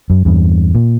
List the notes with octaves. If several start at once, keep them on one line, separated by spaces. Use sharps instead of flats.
F#2
E2 G2
A#2